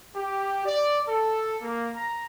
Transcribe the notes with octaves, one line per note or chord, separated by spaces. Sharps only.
G4
D5
A4
A#3
A#5